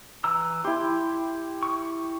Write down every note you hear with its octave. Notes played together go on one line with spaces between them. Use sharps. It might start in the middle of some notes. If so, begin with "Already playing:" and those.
E3 A#5 E6
E4 G4 C6
C#6